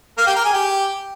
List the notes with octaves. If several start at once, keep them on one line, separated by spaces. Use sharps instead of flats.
A#3 A#4
G4 G5
A#4 A#5
G#4 G#5
G4 G5